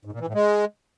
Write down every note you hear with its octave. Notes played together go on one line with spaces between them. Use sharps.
G#2
A#2
E3
A2
G#3